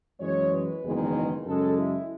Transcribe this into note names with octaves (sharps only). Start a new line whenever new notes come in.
F#2 E3 G#3 C#5
B4
F#1 E2 D#3 G#3
F#2 C#3 G#3 A4
E4